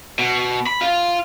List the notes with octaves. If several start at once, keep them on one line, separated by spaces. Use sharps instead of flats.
B2
B5
F4